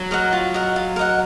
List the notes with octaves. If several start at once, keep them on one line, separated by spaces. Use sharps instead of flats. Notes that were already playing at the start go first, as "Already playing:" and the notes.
Already playing: F#3
A#4 D#5 F#5
F4
A#4 D#5 F#5
F4
A#4 D#5 F#5